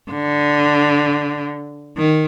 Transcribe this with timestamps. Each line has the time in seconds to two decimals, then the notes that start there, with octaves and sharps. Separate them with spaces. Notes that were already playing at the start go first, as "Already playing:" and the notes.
0.11 D3
1.97 D#3